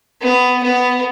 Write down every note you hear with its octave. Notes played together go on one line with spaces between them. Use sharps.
B3
B3